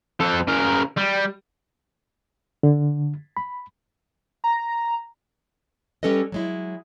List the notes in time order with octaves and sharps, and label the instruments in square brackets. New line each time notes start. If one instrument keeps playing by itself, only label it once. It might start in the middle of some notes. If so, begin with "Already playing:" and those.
[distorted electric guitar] F2 A4
C#3 A#4
G3
[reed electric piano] D3
B5
[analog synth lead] A#5
[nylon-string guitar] G3 C#4 A4 B4 D#5
F#3 G#3 E4